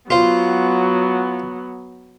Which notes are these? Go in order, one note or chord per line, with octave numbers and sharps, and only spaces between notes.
F#3 B3 F4 C5